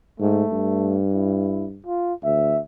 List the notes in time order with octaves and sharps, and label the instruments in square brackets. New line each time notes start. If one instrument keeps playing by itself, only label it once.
[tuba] G#2 [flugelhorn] A3
[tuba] G2
[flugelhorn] E4
F4
[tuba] D2 [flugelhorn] E5